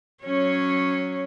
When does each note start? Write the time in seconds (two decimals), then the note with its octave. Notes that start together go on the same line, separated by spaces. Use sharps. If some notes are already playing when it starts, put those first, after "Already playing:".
0.25 F#3 C#4 C#5